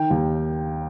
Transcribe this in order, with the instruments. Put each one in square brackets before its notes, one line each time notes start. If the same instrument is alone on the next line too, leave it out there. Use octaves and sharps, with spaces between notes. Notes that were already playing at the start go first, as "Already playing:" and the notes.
Already playing: [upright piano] D#3 G5
D#2